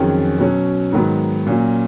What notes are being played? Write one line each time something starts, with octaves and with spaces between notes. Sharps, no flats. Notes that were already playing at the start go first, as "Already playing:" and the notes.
Already playing: F2 D#3 F#3 C#4 G#4
B2 F#3 C#4
G#2 D#3 F#3 B3
A#2 F#3 C#4